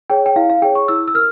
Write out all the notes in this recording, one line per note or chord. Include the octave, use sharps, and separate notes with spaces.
G#4 C#5 G5
G5
E4 F5
F5
G#4 C#5 G5
C#6
E4 E6
E6
A#4 F6